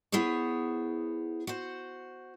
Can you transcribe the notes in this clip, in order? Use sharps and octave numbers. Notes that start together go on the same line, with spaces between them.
B3 E4 G#4 C5 C#5
F#4 C5